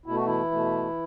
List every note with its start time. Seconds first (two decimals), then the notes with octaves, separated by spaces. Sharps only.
0.06 B2 A3 E4
0.16 F#4
0.25 E3 E4
0.51 B2 A3